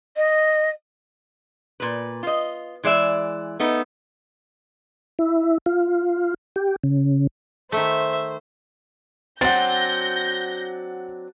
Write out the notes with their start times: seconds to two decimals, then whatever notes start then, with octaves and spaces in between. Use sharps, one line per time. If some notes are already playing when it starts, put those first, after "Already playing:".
0.16 D#5
1.80 A#2 B4
2.23 F4 D#5
2.83 E3 G#3 D5 E5
3.60 A3 B3 D#4
5.19 E4
5.66 F4
6.56 G4
6.83 C#3
7.72 D#3 A3 C5 E5
9.41 F#3 C4 D4 F#5 G6 A6 A#6